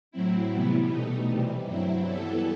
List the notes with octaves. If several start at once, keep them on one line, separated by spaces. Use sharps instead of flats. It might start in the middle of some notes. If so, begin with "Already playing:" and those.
A2 F#3 C4 E4
C3 E3 G3 B3
B2 A3 D#4
C3 E3 G3
G2 F#3 C4 E4
E3 G3 B3 E4 A4